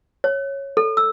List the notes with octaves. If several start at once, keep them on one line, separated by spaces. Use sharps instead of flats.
C#5
A4
E6